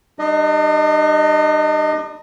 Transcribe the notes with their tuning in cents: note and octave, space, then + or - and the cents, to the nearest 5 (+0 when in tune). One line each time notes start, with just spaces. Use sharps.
G3 +0 D4 +45 D#5 +0